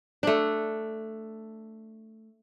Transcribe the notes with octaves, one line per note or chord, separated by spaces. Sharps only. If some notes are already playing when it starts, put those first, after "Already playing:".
A3 D4